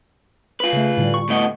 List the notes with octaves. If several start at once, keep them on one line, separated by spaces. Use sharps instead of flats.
F4 B4
C#3 A3
A2 D3 G3
C#6
A2 B3 D#5